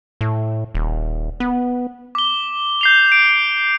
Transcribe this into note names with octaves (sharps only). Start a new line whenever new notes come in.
A2
D#1
B3
D6 G7
G6 C7 F7
D7